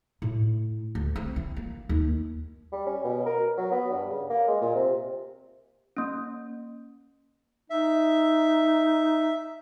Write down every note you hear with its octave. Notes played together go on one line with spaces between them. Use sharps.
A2
D2
C4
E3
A#3
D#2
G3
C#4
B2
A#4
F#3
B3
G2
C#3
A#3
G#3
A#2
C3
A#3 C#4
D#4 E5